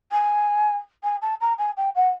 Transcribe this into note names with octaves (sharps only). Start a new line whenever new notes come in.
G#5
G#5
A5
A#5
G#5
G5
F#5